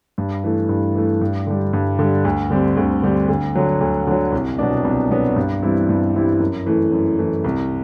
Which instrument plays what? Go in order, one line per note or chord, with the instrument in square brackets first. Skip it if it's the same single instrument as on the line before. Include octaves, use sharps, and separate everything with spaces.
[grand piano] G2
E3 A3
G2
E3 A3
G2
D3 G3
G2
D3 G3
D2
D3 G3 C4
D2
D3 G3 C4
D2
D3 F#3
D2
D3 F#3
C2
B2 F#3 B3 D4
C2
B2 F#3 B3 D4
G2
E3 G3 C4 E4
G2
E3 G3 C4 E4
F#2
E3 A3
F#2
E3 A3
C2